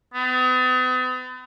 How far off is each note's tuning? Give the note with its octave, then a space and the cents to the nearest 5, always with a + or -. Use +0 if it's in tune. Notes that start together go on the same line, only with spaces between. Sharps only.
B3 +45